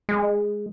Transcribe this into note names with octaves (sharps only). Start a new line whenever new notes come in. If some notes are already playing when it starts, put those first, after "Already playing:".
G#3